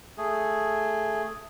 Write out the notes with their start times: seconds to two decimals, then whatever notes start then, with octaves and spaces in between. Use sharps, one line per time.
0.18 A3 G#4